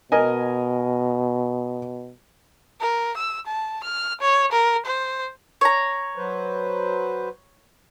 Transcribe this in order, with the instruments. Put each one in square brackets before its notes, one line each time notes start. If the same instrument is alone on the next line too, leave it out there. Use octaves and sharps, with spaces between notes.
[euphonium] B2 [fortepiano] A#4 D#5 G#5
[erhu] A#4
E6
A5
F6
C#5
A#4
C5
[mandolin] C#5 A#5
[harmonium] F#3 B4 C5